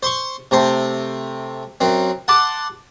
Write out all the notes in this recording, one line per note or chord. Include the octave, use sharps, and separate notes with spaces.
C5 C6 C#6
C3 A3 C5
F#2 C4
F#5 A5 C6 D6